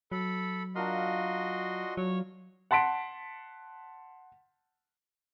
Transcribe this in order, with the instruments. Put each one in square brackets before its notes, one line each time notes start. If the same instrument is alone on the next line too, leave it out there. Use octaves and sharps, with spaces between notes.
[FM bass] F#3 [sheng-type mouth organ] A4 B5
[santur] D4 F4 A#4 [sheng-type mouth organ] F#4 D#5 C6
[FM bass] F#3 [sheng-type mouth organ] C#5
[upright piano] F#5 A5 C6 B6 D7